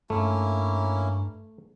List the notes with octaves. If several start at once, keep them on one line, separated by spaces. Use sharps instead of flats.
G2 A3 A#3 C#4 E4